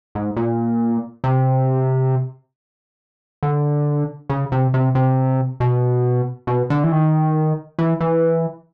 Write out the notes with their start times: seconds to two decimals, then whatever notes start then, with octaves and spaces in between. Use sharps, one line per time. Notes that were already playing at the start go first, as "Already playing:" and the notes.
0.15 G#2
0.37 A#2
1.24 C3
3.43 D3
4.30 C#3
4.52 C3
4.74 C3
4.95 C3
5.60 B2
6.47 B2
6.70 D3
6.84 E3
6.92 D#3
7.79 E3
8.01 E3